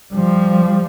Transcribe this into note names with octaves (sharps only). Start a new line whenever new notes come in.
F3 G3